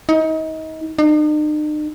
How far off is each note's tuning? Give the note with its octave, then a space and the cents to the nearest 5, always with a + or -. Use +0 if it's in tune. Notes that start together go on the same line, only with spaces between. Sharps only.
D#4 +30
D#4 -45